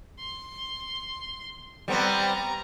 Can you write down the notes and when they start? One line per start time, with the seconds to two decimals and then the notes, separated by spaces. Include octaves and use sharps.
0.19 C6
1.88 G3 B3 C4 A#5